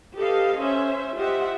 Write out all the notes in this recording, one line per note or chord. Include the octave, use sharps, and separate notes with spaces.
G4 A4 B4 D#5 F5
C#4 C5 E5
F4 G4 C5 D#5 E5 F#5